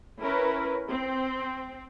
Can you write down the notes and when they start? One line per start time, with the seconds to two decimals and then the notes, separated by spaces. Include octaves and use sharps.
0.21 C#4 E4 A#4 B4
0.90 C4